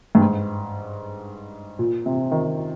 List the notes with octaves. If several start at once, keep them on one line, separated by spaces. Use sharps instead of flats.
G2
G#2
A#2
C3
D#3